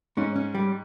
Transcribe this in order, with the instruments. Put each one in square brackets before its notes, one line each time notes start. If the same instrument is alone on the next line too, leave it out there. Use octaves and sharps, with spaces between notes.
[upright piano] G#2 [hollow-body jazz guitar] C#4
[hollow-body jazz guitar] C#4
G3